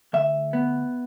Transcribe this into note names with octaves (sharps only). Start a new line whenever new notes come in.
D2 E5
B3